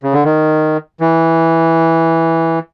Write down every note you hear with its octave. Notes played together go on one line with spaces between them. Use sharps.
C#3
D3
D#3
E3